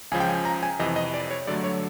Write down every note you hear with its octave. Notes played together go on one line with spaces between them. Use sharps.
C#2 C#3 F3 G#5
G5
G#5
A#5
G#5
F2 C3 E3 D#5
D#5
D5
C#5
G2 D3 F#3 A3 D5
C#5